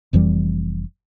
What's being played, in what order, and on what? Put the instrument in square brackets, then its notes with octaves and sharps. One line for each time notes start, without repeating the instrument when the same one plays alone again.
[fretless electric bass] F1 F2 E3 G3